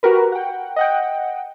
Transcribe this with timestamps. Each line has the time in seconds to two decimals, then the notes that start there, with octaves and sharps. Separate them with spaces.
0.03 F#4 G4 A#4 B4
0.32 F#5 G5
0.76 D#5 F#5 G5